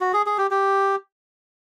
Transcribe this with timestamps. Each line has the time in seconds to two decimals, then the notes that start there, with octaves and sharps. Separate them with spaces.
0.01 F#4
0.13 G#4
0.26 G#4
0.38 G4
0.51 G4